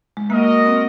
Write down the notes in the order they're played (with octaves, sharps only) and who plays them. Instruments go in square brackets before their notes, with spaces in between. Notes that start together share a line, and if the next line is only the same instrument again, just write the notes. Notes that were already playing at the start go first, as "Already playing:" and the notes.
[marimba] G#3
[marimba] A#3 [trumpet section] F#4 A#4 D#5
[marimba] C4